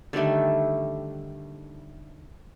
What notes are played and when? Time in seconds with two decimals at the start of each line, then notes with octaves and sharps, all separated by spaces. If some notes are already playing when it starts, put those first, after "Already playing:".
0.13 D3 D#3 G3 A3